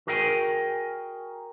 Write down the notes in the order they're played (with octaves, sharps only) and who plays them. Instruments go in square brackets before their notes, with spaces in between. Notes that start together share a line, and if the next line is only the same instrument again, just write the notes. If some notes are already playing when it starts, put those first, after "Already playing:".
[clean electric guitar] F#4 G#4 A#4 E5 G5 G#5